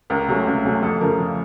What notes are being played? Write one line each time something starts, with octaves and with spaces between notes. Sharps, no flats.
C#2 A#4
C3 F#3 A3 C#4
C#2
C3 F#3 A3 C#4
F2 A4
C#3 F3 A3 A#4
F2